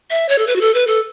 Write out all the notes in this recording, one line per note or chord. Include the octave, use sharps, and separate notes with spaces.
E5
C#5
A4
B4
F#4
A4
B4
A4